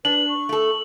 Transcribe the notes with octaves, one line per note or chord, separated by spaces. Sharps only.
D4 B4 F#7
C#6
A3 A4